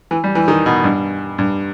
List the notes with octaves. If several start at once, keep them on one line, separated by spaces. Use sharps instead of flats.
E3
G3
E3
D#3
B2
G2
G2